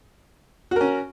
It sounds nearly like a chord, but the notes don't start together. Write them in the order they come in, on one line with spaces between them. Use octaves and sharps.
F#4 A#4 C#4